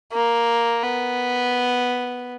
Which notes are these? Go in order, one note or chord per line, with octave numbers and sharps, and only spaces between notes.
A#3
B3